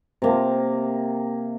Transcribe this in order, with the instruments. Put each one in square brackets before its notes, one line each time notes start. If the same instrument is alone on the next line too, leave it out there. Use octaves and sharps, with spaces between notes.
[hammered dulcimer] C3 A#3